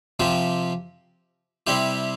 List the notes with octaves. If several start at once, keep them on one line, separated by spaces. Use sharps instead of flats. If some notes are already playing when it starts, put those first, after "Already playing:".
C3 F3 C4 G4
C3 G3 C4 E4 G4